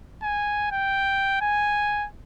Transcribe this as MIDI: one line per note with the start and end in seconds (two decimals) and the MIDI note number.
0.23 0.67 80
0.72 1.41 79
1.41 2.07 80